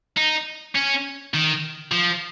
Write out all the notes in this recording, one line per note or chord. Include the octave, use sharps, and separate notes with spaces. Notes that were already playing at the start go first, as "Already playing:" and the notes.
D#4
C#4
D#3
F3